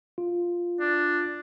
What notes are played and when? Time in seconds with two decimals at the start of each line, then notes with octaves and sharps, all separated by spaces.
0.18 F4
0.80 D4